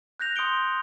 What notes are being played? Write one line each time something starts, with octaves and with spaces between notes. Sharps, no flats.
F#6 G6 A#6 F7
C6 D#6 G6 C#7 D7 G7